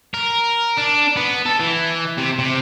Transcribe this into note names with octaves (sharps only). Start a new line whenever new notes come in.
A#4
D4
B3
A4
E3
C3
C3